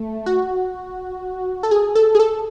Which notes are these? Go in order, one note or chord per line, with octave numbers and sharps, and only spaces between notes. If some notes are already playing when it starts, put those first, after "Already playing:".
Already playing: A3
F#4
A4
G#4
A4
G#4
A4